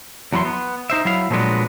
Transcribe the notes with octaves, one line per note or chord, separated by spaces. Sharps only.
E2 F#3 E4 B5 C6
B3
D#4 C5 E5
F#3 E4 F5
A#2 F3 F#3 G#3 B3 D4